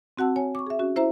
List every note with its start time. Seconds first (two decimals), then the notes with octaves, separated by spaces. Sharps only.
0.17 C4 F#4 F#5 A5 E6
0.36 C#5 G#5
0.55 C#6 D6
0.67 G#4 E5
0.79 C#4 F#4
0.96 E4 C5 E5 A#5